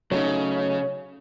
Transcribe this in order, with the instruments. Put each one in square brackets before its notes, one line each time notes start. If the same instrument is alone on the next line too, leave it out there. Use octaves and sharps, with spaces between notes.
[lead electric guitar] C#3 [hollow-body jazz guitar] F#3 A3 D#4 [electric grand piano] C#5